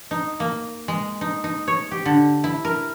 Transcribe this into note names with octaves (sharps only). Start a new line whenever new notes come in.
D#4
A#3
G#3
D#4
D#4
C#5
G4
D3
E4
A#4